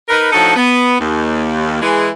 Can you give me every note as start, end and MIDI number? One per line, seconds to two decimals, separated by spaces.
0.08 0.29 63
0.08 0.29 70
0.08 0.29 71
0.32 0.54 45
0.32 0.54 53
0.32 0.54 62
0.32 0.54 63
0.32 0.54 66
0.32 0.54 69
0.56 0.95 59
1.00 1.78 39
1.81 2.08 52
1.81 2.08 56